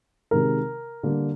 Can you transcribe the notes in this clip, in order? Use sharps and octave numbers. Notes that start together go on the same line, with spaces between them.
C3 D#3 G#3 A#4
D3 G3 A#3